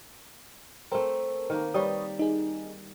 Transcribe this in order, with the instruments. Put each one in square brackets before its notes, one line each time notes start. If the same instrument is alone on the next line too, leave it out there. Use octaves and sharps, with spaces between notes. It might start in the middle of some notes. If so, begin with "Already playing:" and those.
[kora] A3 C4 [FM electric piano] A#4
[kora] D#3 A#3
[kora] G3 [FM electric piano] B4 C#5 D#6
[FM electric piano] D#4 G#4